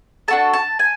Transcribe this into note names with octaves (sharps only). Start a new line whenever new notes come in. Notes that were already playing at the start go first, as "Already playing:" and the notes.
D4 F#4 A4 A5
A5
G#5